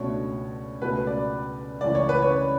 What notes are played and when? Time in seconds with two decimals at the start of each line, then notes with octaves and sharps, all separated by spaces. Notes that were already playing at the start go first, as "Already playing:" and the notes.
Already playing: C#2 B2 A3 D4 C#5
0.82 C#2 B2 A3 B4
1.07 D5
1.81 C#2 C#3 E3 A3 C#4 D5
1.95 C#5
2.09 B4
2.22 C#5